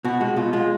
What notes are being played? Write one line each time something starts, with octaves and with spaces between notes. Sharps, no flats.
B2 F#4
G#3 F#4
B2 F4
G#3 F4